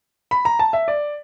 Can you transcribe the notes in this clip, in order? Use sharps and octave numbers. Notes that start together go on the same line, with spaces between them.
B5
A#5
A5
E5
D5